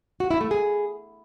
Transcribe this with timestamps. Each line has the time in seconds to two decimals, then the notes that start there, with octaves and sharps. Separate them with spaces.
0.20 F#4
0.31 E4
0.41 A3
0.51 G#4